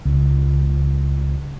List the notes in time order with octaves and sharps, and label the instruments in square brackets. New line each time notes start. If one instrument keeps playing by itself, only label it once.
[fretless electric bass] C#2